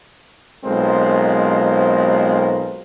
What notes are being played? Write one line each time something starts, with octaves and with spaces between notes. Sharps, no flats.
B1 G#3 C4 F4 A#4 C5